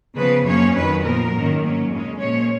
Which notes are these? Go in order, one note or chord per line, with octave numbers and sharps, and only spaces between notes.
C#3 F3 B3 B4
F#2 F3 A#3 C#4 C#5
F2 D#3 F#3 B4
A#2 F3 B3 A#4
G#2 D#3 F#3 A#3 C#4
G#2 F#3 A#3 C#4
F2 C#3 G#3 C#4
A#2 F3 G#3 C#4 C#5